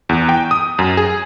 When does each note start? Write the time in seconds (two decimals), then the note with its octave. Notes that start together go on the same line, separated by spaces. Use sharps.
0.09 E2
0.29 G5
0.51 D#6
0.79 F#2
0.97 G#4